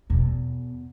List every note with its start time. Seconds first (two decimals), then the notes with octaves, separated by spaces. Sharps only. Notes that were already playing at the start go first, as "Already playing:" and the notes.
0.10 E2 B2